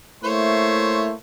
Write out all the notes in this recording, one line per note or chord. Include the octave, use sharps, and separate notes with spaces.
A3 A#3 E4 C5 C#5